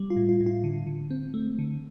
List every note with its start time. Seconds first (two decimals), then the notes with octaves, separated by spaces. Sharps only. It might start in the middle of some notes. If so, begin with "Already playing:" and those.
Already playing: G3
0.10 F4
0.16 A2
0.29 F4
0.41 A2
0.46 F4
0.64 D3
0.87 D3
1.11 C4
1.34 A3
1.59 D3